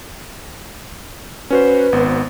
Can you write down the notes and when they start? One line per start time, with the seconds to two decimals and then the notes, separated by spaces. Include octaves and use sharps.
1.50 C#4 F#4 B4 C5
1.92 G#1 B3 C5